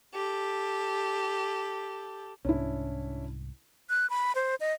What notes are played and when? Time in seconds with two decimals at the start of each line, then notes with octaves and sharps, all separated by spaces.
0.12 G4 A4
2.45 C2 G#2 C#4 D4 E4
3.90 F#6
4.10 B5
4.35 C5
4.60 D#5